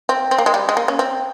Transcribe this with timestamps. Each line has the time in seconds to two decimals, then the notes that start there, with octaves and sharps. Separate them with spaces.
0.09 C4
0.31 C4
0.38 A#3
0.46 G#3
0.54 G3
0.69 G#3
0.77 A#3
0.88 C#4
0.99 C4